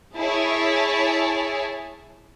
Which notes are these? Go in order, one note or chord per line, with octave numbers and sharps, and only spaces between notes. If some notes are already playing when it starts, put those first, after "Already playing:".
E4 G#4 C#5 A5